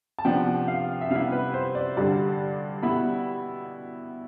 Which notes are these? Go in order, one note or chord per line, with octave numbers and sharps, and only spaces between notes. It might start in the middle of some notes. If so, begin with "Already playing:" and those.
A5
C3 F3 B3 D4 G5
F5
E5
C3 G3 B3 E4 F5
B4
C5
D5
G2 D3 G3 D5
B2 G3 B3 E4 B5